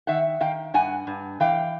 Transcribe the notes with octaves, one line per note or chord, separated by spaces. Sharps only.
D#3 E5 F#5
D#3 F5 G5
G2 F#5 G#5
G2
E3 F5 G5